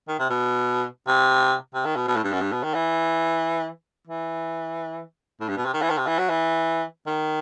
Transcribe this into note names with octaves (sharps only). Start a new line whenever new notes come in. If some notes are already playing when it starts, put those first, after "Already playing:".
D#3
C3
B2
C3
C3
D#3
B2
B2
A2
G2
F#2
G2
B2
D#3
E3
E3
A2
G2
B2
C3
D#3
E3
D#3
C3
E3
F#3
E3
D#3